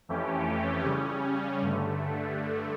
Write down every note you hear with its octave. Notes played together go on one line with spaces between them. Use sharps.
F2 E3 A3 C#4 G4
C#3 G3 C#4
G2 D3 A3